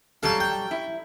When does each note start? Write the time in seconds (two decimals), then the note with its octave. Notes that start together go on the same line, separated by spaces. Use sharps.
0.23 F#3 G3 A4 F5 A5
0.40 G5
0.71 E4